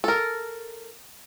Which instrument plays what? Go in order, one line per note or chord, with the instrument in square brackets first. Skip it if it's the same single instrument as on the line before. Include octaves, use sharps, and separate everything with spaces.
[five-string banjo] A4 A#4